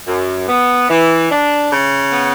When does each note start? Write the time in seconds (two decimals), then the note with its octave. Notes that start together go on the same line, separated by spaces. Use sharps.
0.07 F#2
0.48 B3
0.89 E3
1.31 D4
1.71 C#3
2.11 B3